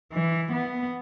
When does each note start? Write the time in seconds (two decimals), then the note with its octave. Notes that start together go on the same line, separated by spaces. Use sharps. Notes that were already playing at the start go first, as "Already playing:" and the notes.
0.13 E3
0.52 B3